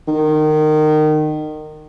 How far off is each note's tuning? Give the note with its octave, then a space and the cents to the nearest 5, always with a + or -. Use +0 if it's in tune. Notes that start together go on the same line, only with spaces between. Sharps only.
D#3 -20